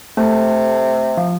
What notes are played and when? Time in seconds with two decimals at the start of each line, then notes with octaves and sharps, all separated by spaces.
0.17 C3 A3
1.17 F3